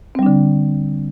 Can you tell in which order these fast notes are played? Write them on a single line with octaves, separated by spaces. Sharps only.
C4 G3 D4 D3